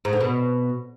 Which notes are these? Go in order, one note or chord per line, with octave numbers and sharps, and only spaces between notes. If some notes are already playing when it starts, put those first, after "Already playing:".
G#2
D3
B2